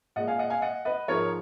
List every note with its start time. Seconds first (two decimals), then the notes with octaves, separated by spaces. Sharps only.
0.16 A#2 G#3 D#5 F#5
0.28 F5 G#5
0.39 D#5 F#5
0.50 F5 G#5
0.62 D#5 F#5
0.85 B4 D#5
1.08 G#2 F3 G#3 A#4 C#5